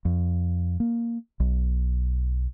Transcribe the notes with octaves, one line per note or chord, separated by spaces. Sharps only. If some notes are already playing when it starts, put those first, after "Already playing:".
F2
A#3
B1